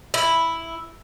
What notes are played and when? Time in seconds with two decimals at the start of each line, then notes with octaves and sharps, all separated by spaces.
0.14 E4